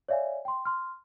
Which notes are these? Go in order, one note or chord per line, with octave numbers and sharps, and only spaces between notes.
C#5 D5 E5 F5 G#5
G5 C6
C6 F6